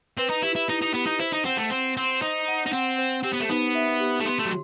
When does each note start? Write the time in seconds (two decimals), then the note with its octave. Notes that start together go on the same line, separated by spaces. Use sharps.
0.17 C4 B4
0.30 D#4
0.42 E4 G4
0.55 E4
0.68 D#4 E4
0.82 D#4
0.94 B3 G4
1.07 D#4
1.20 E4 C5
1.33 D#4
1.45 C4 F#5
1.57 A3
1.70 C4 C5
1.96 C4 C6
2.22 D#4 C5
2.48 F#5
2.66 D#4
2.72 C4 F#5
2.98 C5
3.23 C4 G4
3.33 B3
3.40 A3
3.49 B3 D#4
3.75 E5
4.00 G4
4.20 A3
4.26 B3 C6
4.39 A3
4.45 F#3